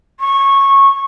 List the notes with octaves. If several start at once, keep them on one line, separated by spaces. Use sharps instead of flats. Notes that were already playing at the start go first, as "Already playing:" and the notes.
C#6